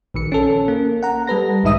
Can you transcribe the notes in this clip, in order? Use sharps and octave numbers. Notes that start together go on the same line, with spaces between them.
A#1 D#3 C#7
C#4 A4
A#3
F#5 A#5
G3 A4 B4 A#6
B1 G#2 D#3 D#4 E5 D#6